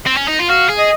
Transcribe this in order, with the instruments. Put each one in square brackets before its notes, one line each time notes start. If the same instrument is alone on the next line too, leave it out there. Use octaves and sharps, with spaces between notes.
[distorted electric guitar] C4
C#4
D#4
F4
[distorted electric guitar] F#4 [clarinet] F5
[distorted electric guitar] G#4
[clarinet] D#5